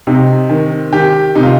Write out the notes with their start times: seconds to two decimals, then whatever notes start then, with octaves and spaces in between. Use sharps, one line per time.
0.07 C3 D#4
0.49 D#3
0.92 D#3 G4
1.35 C3 D#4
1.43 F4